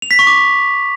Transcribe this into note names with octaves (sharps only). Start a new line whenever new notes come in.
F7
B6
C#6
D6